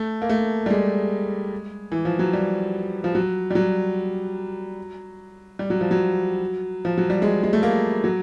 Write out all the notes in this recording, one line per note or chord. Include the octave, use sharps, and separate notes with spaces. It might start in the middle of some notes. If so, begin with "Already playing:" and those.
Already playing: A3
A#3
A3
G3
G#3
E3
F3
F#3
G3
F3
F#3
G3
F#3
G3
F#3
F3
F#3
F3
F#3
G3
G#3
G#3
A3
A#3
F#3